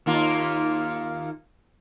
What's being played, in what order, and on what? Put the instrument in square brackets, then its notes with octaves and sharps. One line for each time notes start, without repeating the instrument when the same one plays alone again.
[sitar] D#2 A#3 F4